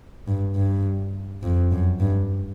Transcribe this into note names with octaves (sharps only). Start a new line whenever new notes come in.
G2
G2
F2
F#2
G2